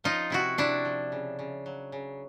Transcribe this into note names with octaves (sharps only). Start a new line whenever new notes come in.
F3 D#4 F4
C3 E4 F#4
C3 D4 E4
F3
C#3
C#3
F#3
C#3